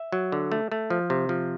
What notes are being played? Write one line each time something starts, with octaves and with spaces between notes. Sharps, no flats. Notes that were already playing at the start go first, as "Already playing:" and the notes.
Already playing: E5
F#3
D3
A3
A3
F3
C3
F3